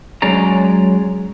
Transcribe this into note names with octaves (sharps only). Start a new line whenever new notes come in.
F#3 G#3 C#4 D5 A#5